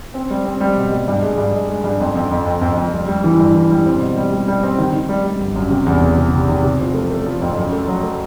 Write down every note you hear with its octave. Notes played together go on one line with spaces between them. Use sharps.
C4
G3
C4
G3
B2
G3
G2
G#3
G2
G#3
G#3
G2
F2
F2
F2
F2
F2
F2
G3
G3
E3
G2
E3
G3
C4
B2
G3
G3
G3
C4
D#3
D#3
G3
G3
G1
F#2
C3
E2
E2
C3
C3
D#3
C3
F3
A3
A3
F3
F2
F#2
A3
F#3
A3